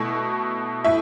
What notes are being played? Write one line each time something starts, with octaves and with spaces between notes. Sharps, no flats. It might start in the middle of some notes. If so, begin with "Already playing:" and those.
Already playing: B2 A3 E4
A2 E5